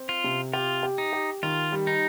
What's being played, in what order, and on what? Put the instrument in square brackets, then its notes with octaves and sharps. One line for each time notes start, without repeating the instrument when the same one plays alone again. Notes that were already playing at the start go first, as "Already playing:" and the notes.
Already playing: [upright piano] C4
[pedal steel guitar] F4
[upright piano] C3
[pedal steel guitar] F4 [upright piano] G4
[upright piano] G4
[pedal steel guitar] D#4
[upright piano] G4
[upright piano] D#3 [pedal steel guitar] F4
[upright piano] G3
[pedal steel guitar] D#4